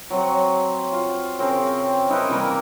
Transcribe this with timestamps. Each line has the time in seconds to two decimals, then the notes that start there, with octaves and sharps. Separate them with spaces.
0.10 F#3 C4 C#5
0.93 F4
1.39 C#3 C4 A#4 C#5
2.09 D#4 E4 A#4 B4
2.29 C3 E3 G3 A#3